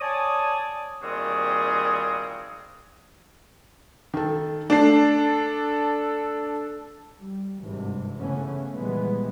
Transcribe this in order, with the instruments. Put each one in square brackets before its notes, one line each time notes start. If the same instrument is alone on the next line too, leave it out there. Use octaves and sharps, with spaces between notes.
[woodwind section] C#5 D5 G#5 A5 D#6
A#2 D#3 G3 C4 F#4 G#4
[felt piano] D#3 A4
[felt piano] A3 C7 [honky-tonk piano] D4 [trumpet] A4
[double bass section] G3
G#1 G2 C3 E3
C#3 E3 A3 B3 C#4
A#2 D#3 E3 G3 G#3 B3